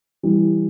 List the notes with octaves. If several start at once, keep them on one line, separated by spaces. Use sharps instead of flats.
E3 G3